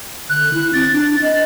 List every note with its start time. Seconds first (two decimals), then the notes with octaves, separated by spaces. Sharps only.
0.30 D3 F#6
0.54 E4
0.73 C4 A6
0.93 D4
1.22 D#5